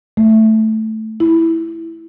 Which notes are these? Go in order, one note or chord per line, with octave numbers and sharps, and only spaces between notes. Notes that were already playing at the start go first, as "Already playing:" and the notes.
A3
E4